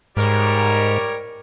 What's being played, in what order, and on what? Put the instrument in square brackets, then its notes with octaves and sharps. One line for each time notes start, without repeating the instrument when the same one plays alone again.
[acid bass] G#2 [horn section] G3 A#4 C#5